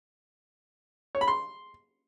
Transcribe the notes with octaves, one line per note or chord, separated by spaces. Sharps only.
C#5
B5
C6